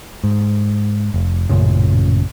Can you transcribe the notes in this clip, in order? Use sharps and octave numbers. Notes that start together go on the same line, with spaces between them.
G#2
F1
A1 F#2 A#2 C#3